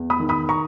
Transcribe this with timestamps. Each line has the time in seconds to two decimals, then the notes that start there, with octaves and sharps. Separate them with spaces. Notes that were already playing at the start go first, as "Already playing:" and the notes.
Already playing: E2
0.10 B5 D#6
0.20 D#3
0.29 B5 D#6
0.49 A#5 C#6